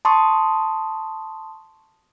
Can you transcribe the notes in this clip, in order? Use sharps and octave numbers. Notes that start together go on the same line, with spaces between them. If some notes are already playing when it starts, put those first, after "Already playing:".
A5 C6 C#6 D#6